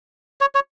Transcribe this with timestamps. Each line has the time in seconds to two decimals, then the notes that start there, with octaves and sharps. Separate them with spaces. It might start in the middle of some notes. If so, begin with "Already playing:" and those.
0.41 C#5
0.55 C#5